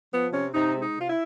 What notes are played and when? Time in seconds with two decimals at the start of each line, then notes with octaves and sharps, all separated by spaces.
0.12 F3 B3
0.33 C3 C#4
0.54 C3 D#4
0.75 G#3
0.82 D#4
0.96 C3 F4
1.10 E4